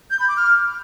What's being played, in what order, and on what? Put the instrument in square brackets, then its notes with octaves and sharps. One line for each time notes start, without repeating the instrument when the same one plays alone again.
[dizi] G6
B5
D6
F6